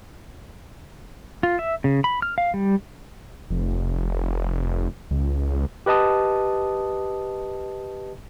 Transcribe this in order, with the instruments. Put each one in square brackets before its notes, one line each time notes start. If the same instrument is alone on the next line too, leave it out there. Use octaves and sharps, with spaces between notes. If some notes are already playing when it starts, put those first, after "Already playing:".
[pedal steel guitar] F4
E5
C#3
B5
F6
F5
G3
[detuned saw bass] F1
C#2
[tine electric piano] G4 B4 D#5 A5 D#6